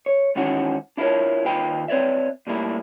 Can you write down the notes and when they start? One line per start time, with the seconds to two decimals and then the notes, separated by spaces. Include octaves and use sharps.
0.06 C#5
0.35 G#2 D#3 E3 C#4 F#4
0.97 D4 E4 F4 A4 A#4 C#5
1.45 D#2 D#3 F4 B4 G5 B5
1.88 C4 B4 C#5 D5 E5
2.47 A#2 G3 A3 A#3 E4